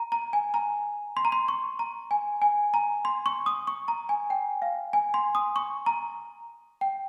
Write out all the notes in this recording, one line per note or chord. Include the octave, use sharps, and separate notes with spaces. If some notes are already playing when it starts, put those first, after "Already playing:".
Already playing: A#5
A#5
G#5
A#5
C6
A#5
C6
C#6
A#5
G#5
G#5
A#5
C6
C#6
D#6
C#6
A#5
G#5
G5
F5
G#5
C6
D#6
C#6
A#5
G5